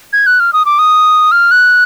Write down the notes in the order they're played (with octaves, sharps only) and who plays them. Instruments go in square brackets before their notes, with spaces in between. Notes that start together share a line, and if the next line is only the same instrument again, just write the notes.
[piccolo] G#6
F#6
F6
D#6
D6
D#6
F6
F#6